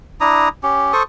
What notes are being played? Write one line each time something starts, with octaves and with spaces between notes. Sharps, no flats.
D4 E4 A#5 D#6
C#4 G4
A4 C5 C#6 D#6